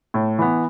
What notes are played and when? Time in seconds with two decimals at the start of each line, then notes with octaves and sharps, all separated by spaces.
0.14 A2
0.39 E3 B3